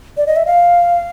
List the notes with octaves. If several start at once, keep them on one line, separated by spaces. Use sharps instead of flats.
D5
D#5
E5
F5